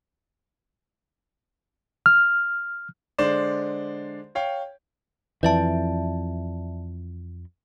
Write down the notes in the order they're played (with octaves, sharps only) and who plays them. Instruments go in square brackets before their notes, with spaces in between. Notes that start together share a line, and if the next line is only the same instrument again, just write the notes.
[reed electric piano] F6
[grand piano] D3 G#3 C5 D5 E7
C#5 F5 G5
[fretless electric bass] F2 E3 [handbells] D5 E5 A5